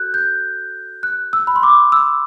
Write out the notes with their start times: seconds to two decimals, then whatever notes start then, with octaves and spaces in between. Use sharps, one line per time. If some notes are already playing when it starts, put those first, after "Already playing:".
Already playing: F#4 A4 F#6 G6
0.14 G6
1.03 F#6
1.33 E6
1.47 B5
1.56 C6
1.63 D6
1.92 E6